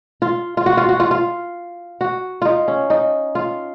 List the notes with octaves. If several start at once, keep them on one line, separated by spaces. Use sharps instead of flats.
F4
F4
F#4
F4
F#4
F4
F4
F#4
D#4 F4
C#4
D#4
F4